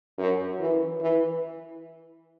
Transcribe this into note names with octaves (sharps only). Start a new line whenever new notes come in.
F#2
E3
E3